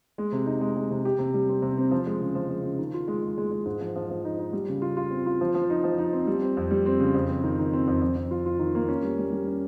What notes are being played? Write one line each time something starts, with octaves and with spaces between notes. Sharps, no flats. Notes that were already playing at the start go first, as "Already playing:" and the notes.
G#3
C3
D#4
G#3
G#3
C3
G4
C3
G3
C4
C3
C4
F3
G#3
C#3
F3
G#3
C#3
D#3
F4
G#3
G#3
G#3
G#3
G#2
F3
F3
F3
D#4
D#4
G3
C#3
F4
F4
C4
F4
F3
F3
D#4
F3
D#4
C4
G3
C4
F2
G3
C4
C#3
F2
C4
D#3
D#3
C4
F2
F2
F2
F4
F4
D#3
A#3
C#4
G3
G3
G3
C#4